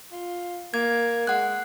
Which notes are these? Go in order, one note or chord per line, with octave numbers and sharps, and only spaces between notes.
F4
A#3 G#6
G#3 F#5 F#6